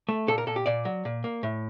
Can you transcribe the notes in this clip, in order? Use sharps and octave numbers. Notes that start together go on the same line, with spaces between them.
A3
A#2 A4
A#4
A#2 A4
G4
A#2 D5
F#3
A#2
A#3
A2